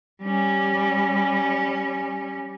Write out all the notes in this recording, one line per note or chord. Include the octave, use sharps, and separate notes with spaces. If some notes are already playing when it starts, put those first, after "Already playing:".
G3 C#4